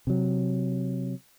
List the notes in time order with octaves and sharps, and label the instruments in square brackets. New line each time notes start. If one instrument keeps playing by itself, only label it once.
[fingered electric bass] C3 F#3